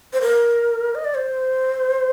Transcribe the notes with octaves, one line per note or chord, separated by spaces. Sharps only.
C5
A#4
D#5
D5
C5